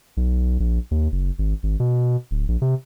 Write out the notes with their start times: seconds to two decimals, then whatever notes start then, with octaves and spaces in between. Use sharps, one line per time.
0.17 B1
0.60 A#1
0.91 D#2
1.12 F#1
1.39 G#1
1.63 G#1
1.80 B2
2.31 D1
2.48 A#1
2.62 C3